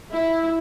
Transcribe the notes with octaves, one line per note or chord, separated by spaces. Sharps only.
E4